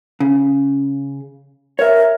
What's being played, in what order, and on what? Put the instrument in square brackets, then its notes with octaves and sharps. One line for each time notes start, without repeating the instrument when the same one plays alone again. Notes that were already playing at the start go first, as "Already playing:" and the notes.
[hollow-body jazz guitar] C#3
[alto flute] A#4 [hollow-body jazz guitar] C#5 E5